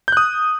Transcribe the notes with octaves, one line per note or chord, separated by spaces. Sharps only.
D#6 F#6 G6